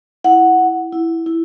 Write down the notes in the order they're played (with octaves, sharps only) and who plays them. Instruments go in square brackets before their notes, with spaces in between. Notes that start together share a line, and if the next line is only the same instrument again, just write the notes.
[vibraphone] E4 F#5
E4
E4
E4